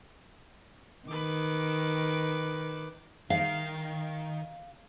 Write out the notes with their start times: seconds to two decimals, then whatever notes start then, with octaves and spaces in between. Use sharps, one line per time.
1.08 D#3 B4 D6
3.30 D#3 F5